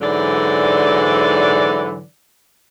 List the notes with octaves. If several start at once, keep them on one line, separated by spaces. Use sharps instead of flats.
G#2 D3 E3 F#3 D5